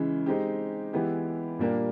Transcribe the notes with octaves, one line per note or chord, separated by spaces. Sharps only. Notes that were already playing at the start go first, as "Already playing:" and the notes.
Already playing: C#3 E3 G#3
G#3 C4 D#4 G4
E3 G#3 B3 E4 G4
A#2 G3 A#3 D4 G4